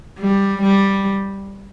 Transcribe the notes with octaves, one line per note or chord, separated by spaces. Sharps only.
G3
G3